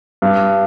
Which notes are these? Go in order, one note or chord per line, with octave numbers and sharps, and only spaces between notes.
G2